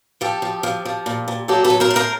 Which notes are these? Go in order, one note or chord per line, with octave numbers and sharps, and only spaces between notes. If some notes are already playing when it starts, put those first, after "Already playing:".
F3 G4 A4
F3
F3
F3
A#2
A#2
F#3 G4 A4
A4 B4
F#3
A#4 C5
A2
A#4 C5